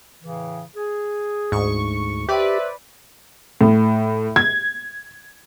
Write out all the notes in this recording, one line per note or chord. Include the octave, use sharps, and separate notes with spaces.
A2 C#3 E3
G#4
D2 G#2 C#6
G4 B4 C5 D5 E5
A2
G#6